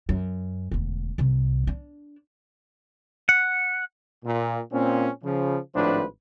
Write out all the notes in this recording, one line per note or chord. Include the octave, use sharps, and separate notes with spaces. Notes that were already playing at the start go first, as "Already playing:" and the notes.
F#2
E1 D2
C2 C3
D4
F#5
A#2
A#2 C4 C#4
C#3 F3
G#1 A2 F3 D4 B4 C5